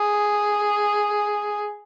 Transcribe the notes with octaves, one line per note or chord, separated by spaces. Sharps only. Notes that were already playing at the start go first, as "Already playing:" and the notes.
Already playing: G#4